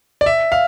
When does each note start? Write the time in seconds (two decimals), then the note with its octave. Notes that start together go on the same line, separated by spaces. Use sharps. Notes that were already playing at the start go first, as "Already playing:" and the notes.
0.21 D5
0.26 E5
0.52 F5